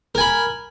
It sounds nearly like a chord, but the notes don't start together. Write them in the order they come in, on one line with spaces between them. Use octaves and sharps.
A#4 G#5 B5